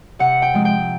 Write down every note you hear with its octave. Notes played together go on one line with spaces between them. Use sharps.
C3 F#5
G5
F3 G#3 C4
G5